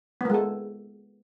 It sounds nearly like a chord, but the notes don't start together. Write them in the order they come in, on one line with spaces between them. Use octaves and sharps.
B3 A#3 G#3 A4